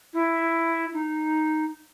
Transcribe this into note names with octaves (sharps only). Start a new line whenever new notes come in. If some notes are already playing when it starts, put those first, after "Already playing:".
E4
D#4